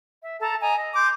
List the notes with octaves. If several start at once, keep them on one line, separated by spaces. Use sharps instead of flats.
E5
A4 A5 A#5
D#5 G#5 A#5
D#5
C6 D6 G6